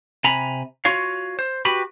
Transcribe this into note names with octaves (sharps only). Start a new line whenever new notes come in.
C3 G#5 A#5 B5
F4 F#4 C#5 F5
C5
F#4 G4 B4 B5